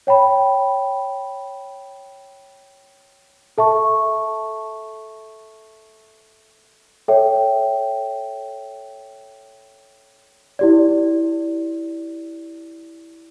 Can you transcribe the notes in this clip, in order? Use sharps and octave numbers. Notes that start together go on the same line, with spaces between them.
C#5 G5 B5
A4 E5 A5 C#6
A4 C#5 E5 G5
E4 G4 D5